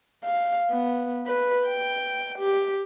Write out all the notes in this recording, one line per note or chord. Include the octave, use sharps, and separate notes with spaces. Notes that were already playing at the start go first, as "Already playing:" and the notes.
F5
B3
B4
G5
G4